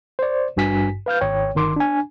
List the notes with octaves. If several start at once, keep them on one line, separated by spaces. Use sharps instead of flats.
C5 D5
G#1 G2 F#4 G#5 B6
B4 F5 F6 G6
G#1 C#5 G5
G1 D#3 C6 D6
D4 G#5